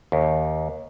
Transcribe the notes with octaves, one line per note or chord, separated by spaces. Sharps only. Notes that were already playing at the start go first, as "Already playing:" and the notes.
D#2